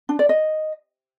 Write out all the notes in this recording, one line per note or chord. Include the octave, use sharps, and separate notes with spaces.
D4
D5
D#5